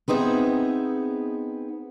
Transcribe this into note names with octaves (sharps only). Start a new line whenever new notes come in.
B3 C4 D#4 G#4 E5